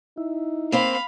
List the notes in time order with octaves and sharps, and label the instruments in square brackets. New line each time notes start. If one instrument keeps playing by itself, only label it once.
[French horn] D#4 [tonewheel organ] E4
[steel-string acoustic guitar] A#3 C4 C5 [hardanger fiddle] F5 B5